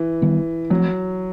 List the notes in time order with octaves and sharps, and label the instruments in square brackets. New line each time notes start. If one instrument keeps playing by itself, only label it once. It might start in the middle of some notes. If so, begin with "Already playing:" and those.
Already playing: [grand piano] E3
[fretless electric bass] D#3 G3 B3
[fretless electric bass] F3 A3 C4 [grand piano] F#3